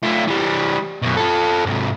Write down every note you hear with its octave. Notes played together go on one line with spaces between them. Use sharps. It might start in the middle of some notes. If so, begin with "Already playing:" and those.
A3 F4
E3 G3
F#2 B2
F4 A4
G#2 C3